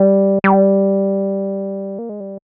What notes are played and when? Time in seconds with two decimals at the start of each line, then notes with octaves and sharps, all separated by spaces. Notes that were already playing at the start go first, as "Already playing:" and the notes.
Already playing: G3
0.44 G3
1.99 A#3
2.09 G#3
2.20 G3